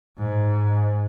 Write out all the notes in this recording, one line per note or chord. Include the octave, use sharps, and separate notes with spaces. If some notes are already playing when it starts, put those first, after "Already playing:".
G#2